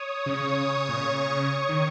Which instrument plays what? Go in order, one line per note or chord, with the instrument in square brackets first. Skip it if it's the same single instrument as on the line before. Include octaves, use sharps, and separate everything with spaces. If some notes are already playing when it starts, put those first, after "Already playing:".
Already playing: [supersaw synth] C#5 D#6
[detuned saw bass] C#3 [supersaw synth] C#6
[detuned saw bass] A#2
C#3
D#3